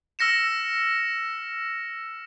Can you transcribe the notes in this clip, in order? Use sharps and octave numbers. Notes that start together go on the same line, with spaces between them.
E6 F6 A#6 C#7 E7